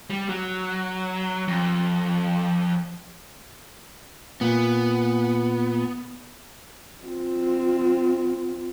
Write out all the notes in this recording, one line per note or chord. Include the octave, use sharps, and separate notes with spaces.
G3
F#3
F2
A#2 B3
C4 F4